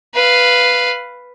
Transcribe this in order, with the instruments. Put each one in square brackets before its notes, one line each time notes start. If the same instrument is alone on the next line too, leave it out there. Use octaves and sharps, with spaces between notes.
[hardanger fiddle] B4 F5